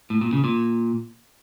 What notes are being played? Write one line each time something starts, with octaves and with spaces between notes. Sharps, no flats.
A2
A#2
C#3
A#2